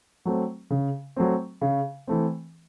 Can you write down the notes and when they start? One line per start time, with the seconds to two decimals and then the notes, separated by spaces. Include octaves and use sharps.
0.25 F#3 A3 C4
0.70 C#3
1.16 F#3 A3 C4
1.61 C#3
2.07 E3 A3 C4